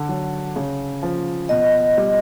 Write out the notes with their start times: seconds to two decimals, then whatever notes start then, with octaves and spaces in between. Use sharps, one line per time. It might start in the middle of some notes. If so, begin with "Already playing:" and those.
Already playing: D3
0.09 F#3
0.56 C#3
1.03 F3
1.49 B2 D#5
1.97 G3